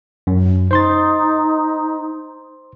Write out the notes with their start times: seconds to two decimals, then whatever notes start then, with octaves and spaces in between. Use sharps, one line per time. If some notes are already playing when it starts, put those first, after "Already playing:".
0.27 F#2
0.71 D#4 C5 C6 A6